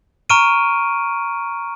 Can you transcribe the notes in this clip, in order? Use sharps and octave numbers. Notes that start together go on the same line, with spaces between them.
A#5 C#6 F6 D7 D#7